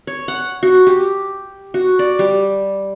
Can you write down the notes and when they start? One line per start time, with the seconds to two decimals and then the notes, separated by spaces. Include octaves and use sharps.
0.07 C#5
0.28 F#5
0.63 F#4
0.87 G4
1.74 F#4
1.99 D5
2.19 G3